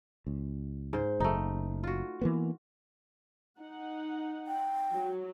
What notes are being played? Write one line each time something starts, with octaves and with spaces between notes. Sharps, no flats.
C#2
G#2 C5
F#1 A3 D#4
F4 F#4
E3 A#3 B3
D#4 F#5
G5
F#3